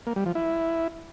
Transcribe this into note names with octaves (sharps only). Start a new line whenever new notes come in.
A#3
G3
F3
E4